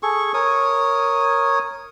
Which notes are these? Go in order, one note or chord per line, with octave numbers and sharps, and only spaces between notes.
G#4 A4 C#6
A#4 C#5 D#6